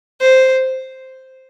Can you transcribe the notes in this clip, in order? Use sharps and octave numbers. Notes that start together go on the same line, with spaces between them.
C5